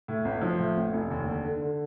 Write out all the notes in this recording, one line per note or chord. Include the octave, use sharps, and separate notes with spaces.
A2
A1
F3
A2
A1
F1
D#2
D3
D3
D3